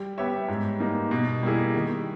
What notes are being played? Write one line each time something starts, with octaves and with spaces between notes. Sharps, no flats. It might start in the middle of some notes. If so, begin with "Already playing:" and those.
Already playing: G3
B3 G4 C#5 E5
G#2
G3 A#3 D#4
B2
G3 A#3 E4 G#4
D#3